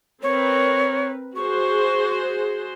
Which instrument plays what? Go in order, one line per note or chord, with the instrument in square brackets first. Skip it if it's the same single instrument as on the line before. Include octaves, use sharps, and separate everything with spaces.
[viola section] C4 A#4 B4 [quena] C#5
[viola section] F#4 G#4 C5 [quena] C#6